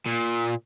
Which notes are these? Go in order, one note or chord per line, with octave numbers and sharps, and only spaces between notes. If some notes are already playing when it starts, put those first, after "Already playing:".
A#2